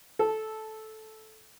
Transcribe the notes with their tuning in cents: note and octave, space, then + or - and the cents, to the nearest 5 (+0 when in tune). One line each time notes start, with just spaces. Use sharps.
A4 -10